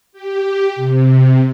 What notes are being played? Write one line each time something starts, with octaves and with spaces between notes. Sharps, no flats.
G4
C3